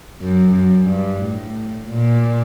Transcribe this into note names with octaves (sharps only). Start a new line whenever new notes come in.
F#2
F#2
G2
A2
A#2